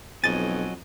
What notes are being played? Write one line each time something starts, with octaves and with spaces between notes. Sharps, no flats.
B1 F2 F#3 D#5 G#5 A6